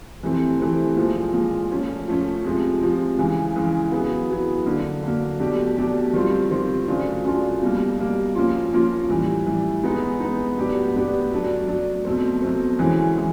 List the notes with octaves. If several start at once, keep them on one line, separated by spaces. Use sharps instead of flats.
C3 E3 A3 C4
C3 E3 A3 C4
A#2 F3 G#3
A#2 F3 G#3
F3 A3 C#4
F3 A3 C#4
C3 F3 G#3
C3 F3 G#3
C#3 E3 G#3
C#3 E3 G#3
F#3 B3 E4 G#4
F#3 B3 E4 G#4
D3 F#3 A#3
D3 F#3 A#3
B2 F#3 A3 D4 G4
B2 F#3 A3 D4 G4
D#3 G3 C4 F4
D#3 G3 C4 F4
C#3 F#3 A3 D4 F4
C#3 F#3 A3 D4 F4
B2 G3 A#3
B2 G3 A#3
F3 A#3 C#4 F4
F3 A#3 C#4 F4
A2 E3 G3
A2 E3 G3
G#3 B3 D#4
G#3 B3 D#4
A2 F#3 B3 D4 G4
A2 F#3 B3 D4 G4
F#3 A3 D4
F#3 A3 D4
B2 F#3 A3 C4
B2 F#3 A3 C4
E3 G#3 C#4 F#4
E3 G#3